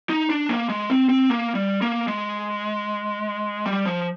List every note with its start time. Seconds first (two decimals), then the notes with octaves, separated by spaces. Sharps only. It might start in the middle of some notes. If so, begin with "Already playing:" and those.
0.09 D#4
0.30 D4
0.49 A#3
0.69 G#3
0.90 C4
1.09 C4
1.29 A#3
1.55 G3
1.82 A#3
2.08 G#3
3.66 G3
3.85 F3